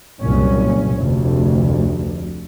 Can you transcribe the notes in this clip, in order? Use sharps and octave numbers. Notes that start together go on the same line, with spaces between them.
F#1 C2 A#2 C#4
F1 D2